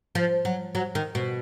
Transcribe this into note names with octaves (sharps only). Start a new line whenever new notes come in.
F3
F#3
F#3
D#3
B2